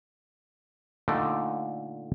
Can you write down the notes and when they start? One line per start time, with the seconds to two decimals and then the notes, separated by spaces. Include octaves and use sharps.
1.08 A#2 D3 A3 D#4 G5